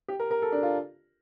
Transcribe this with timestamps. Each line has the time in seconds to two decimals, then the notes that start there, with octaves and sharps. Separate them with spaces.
0.08 G4
0.20 A#4
0.31 A#4
0.42 A4
0.52 D4
0.63 F4